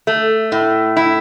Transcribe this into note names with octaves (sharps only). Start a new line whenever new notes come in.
A3
A2
E4